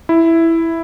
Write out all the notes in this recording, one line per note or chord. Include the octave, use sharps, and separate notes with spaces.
E4